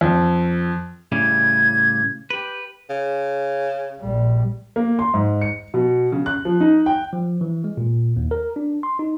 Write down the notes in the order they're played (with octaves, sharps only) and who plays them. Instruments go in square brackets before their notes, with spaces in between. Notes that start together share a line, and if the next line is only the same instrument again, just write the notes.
[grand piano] F2
[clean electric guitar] A2 C#3 G3 [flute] G#6
[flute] G4 [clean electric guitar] B4
[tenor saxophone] C#3
[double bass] A#1 G3
[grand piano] A#3
C6
G#2
C#7
B2
C#3
F#6
F3
D#4
G5
[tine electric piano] F3
E3
G#3
A#2
D#2
A#4
D4
C6
D#4